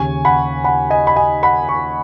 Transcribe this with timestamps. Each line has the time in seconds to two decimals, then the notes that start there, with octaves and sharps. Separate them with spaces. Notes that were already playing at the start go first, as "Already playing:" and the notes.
Already playing: D#2 C#3 G#5 C#6
0.25 F#5 B5
0.64 F#5 B5
0.90 D#5 G#5
1.07 B5
1.16 D#5 G#5
1.43 F#5 B5
1.68 G#5 C#6